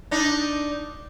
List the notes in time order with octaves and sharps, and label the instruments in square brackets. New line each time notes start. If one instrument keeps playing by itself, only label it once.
[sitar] D4 D#4